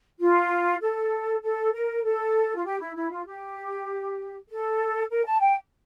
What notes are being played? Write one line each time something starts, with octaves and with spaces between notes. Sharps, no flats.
F4
A4
A4
A#4
A4
F4
G4
E4
E4
F4
G4
A4
A#4
A5
G5